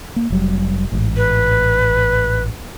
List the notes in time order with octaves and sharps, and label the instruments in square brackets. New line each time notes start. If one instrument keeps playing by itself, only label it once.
[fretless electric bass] A#3
F1 F#3 G3
A1 G#2
[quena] B4